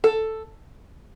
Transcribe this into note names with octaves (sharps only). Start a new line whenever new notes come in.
A4